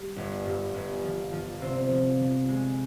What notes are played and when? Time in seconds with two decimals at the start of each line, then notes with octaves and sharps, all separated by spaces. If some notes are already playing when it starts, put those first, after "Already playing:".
Already playing: G3
0.16 G1
0.45 G2
0.74 G1
1.03 F3
1.32 F3
1.61 C3 C4
1.90 F3
2.19 F3
2.48 G#3